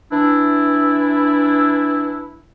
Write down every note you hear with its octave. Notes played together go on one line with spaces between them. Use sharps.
E3 D4 E4